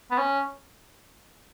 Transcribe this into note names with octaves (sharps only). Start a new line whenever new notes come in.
B3
C#4